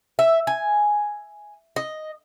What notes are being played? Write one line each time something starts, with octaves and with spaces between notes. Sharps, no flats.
E5
G#5
D#5